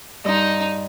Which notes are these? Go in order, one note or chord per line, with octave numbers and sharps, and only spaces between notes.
G2 D#4 D#5 C6